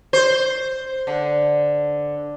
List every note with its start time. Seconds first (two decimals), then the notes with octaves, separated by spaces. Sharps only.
0.13 C5
1.07 D3